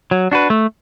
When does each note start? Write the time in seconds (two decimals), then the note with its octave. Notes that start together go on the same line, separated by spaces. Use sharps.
0.11 F#3
0.32 D4 F#4 B4
0.50 A3